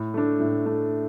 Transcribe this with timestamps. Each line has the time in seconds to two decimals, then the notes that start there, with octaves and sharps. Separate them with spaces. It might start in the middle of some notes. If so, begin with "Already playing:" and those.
Already playing: A2
0.14 A3 D4
0.40 A2
0.65 A3 D4